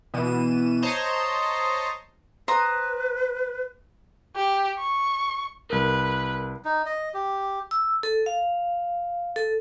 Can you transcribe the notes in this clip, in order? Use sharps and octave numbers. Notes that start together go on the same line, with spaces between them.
B2 E3 D#7 E7
C5 C#5 D#5 A5 A#5 C6
B4 C5 A#5 D#6
G4
C#6
C2 A#4 B4
D#4
D#5
G4
E6
A4
F5
A4